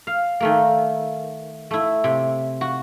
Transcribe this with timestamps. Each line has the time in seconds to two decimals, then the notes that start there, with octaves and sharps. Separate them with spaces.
0.07 F5
0.40 D#3 A3 A#3
1.71 A3 E4
2.04 C3
2.61 F#4